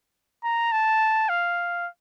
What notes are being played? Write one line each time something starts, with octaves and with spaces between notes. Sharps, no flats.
A#5
A5
F5